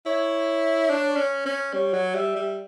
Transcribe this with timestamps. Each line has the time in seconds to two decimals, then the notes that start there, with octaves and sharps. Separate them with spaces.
0.06 E4 C#5
0.89 D4
1.17 C#4
1.46 C#4
1.73 G3 C#5
1.93 F#3
2.15 G3 E5
2.36 G3